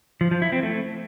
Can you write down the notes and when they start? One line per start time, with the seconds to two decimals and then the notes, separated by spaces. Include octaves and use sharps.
0.21 F3
0.31 F3
0.42 E4
0.52 C4
0.63 A3